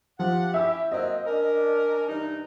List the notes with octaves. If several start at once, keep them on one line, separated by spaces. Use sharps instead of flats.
F3 G4 F#5
C#4 E4 G4 E5 E6
F#3 A#3 C4 D#5
C#4 D4 A#4
G2 E3 D#4